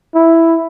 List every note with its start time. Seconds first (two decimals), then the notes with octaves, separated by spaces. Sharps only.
0.15 E4